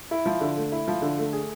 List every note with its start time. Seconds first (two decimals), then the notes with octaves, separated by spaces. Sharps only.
0.11 E4
0.26 F3
0.41 D3
0.57 A3
0.72 E4
0.88 F3
1.02 D3
1.18 A3
1.33 G#4